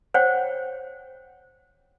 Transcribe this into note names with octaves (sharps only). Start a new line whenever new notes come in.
C5 C#5 F#5 G5